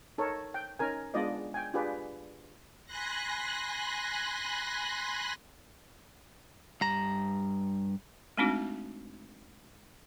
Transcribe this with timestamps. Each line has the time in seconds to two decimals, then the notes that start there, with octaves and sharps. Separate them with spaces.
0.18 D#4 A4 A#4 C#5
0.54 G5
0.79 C#4 D#4 A#4 G#5
1.14 G#3 B3 D4 F4 D5 D#5
1.54 G5 G#5
1.74 D4 F4 G4 G#4 B4 D5
2.85 G#5 B5 C6 F#6 A#6
6.81 G2 A#5
8.38 G#3 A3 C4 D4 D#4 F#4